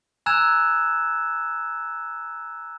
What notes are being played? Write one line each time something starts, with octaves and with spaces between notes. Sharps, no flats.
G#5 A#5 E6 F#6 G#6 E7